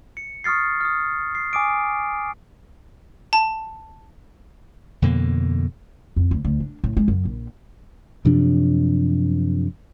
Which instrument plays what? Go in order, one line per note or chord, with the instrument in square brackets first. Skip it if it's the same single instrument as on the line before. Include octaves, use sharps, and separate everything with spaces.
[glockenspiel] C#7
C#6 D#6 F6 A6 C7
D#6 F6
C7
G#5 D6 D#6 D7
[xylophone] A5
[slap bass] F2 B2 D3 A#3
[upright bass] F2
D2
D2
D4
A2
G#3
F#2
A#1
[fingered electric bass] F#2 C3 F3 D4